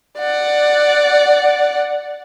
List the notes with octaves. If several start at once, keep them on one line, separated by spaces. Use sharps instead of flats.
D5 F#5